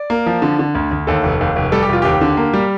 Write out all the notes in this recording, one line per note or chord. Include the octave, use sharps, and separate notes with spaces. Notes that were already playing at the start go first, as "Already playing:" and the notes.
Already playing: D5
A#3
F3
D3
D3
D2
D2
D#2 A4
F1
D#2
F1
G3 A4
G4
F1 F4
D#2 G4
D3
A#3
G3